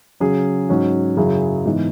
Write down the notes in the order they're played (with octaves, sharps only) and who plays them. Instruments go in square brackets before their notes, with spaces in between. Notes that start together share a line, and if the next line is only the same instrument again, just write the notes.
[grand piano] C#3 F#3 C#4 G#4
G#2 F#3 C#4 F#4
F#2 C#3 F#3 E4 G#4
G#2 E3 B3